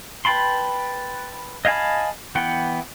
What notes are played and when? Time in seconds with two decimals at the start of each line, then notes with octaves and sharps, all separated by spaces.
0.25 B4 G5 A5 B5 C6
1.65 D#5 F5 G#5 A5 B5
2.35 E3 B3 F#5 G5